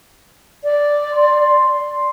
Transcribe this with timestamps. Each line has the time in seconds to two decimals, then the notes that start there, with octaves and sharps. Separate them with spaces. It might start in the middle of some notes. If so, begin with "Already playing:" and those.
0.64 D5
1.13 C6